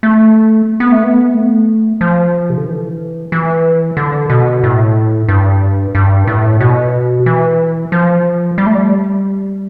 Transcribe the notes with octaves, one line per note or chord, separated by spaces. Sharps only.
A3
B3
A3
B3
A3
F3
C3
D3
E3
E3
D3
B2
A2
G2
G2
A2
B2
E3
F3
G3
A3
G3